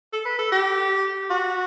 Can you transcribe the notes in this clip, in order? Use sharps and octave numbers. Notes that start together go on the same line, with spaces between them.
A4
B4
A4
G4
F#4